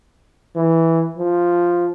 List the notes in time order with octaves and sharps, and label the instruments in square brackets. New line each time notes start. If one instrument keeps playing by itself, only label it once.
[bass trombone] E3
F3